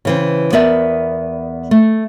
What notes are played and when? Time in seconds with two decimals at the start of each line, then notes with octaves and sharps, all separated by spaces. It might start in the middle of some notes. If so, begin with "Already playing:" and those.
0.05 C#3 E3 C4
0.52 E2 B3 A#4 D5 E5
1.71 A3